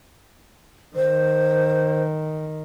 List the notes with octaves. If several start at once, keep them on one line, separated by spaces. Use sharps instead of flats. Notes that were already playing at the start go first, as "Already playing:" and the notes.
D#3 C5